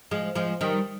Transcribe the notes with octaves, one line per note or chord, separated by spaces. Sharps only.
F3 G#3
F3 G#3
D#3 G3